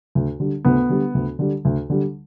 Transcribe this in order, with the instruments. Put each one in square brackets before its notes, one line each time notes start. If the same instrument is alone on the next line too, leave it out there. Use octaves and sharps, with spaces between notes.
[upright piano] D2
D3 G3
D2 B3
D3 G3
D2
D3 G3
D2
D3 G3